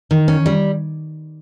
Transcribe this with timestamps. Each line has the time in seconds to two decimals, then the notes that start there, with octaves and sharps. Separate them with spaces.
0.11 D#3
0.28 C#4
0.46 G3